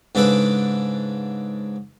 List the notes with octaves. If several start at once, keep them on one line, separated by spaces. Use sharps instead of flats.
G#2 C#3 D4 A4 B4 D6